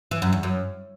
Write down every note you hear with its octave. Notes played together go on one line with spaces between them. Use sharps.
E3
F#2
E2
F#2